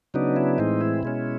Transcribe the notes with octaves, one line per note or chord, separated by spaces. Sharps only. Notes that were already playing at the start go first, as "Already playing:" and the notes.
C#3 F#3 B3 D4 D#4
E4
A2 E3 G#3 C4 D#4
E4
B2 G#3 C#4